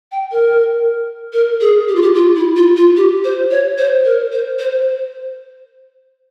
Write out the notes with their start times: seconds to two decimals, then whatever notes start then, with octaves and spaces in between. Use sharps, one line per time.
0.12 G5
0.32 A#4
1.33 A#4
1.61 G#4
1.89 G4
1.96 F4
2.02 G4
2.15 F4
2.36 E4
2.56 F4
2.77 F4
2.97 G4
3.24 C5
3.51 C#5
3.78 C5
4.05 A#4
4.32 C5
4.59 C5